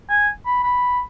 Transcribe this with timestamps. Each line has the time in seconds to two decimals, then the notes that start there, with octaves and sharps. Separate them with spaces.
0.10 G#5
0.46 B5
0.64 B5